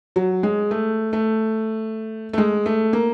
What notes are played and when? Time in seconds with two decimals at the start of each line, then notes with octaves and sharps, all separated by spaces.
0.16 F#3
0.43 G#3
0.71 A3
1.13 A3
2.33 A3
2.38 G#3
2.66 A3
2.93 A#3